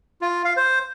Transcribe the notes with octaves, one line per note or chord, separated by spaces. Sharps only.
F4
F5
C5